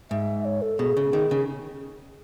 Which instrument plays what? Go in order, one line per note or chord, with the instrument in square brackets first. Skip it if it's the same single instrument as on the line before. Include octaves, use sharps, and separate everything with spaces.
[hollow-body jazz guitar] G#2 [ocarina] E5
[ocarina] C#5
A4
[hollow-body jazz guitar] B2 [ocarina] G#4
[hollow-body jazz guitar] C#3
D#3
C#3